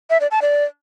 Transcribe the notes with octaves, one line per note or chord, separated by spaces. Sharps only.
E5
D5
A5
D5